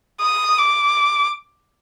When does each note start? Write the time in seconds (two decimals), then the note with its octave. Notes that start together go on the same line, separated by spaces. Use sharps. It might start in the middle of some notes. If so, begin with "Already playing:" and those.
0.21 D#6
0.58 D6